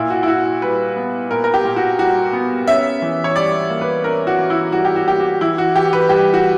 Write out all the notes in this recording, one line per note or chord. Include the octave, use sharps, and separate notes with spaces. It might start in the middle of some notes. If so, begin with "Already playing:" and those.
Already playing: A#2 E4
F#4
E4
A#2 F#4
G3 B4
B3
A#2 A#4
A#4
G4
A#2
F#4
G3 F#4
B3
C#4 E5
E3
C#5
G3 D5
A#3
B4
C#4 A#4
F#4
E3
E4
G3 F#4
G4
F#4
A#3 G4
F#4
E3 E4
F#4
E3 G4
B4
G3 G4
F#4